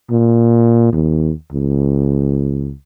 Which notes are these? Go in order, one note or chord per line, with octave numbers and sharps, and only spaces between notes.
A#2
D#2
C#2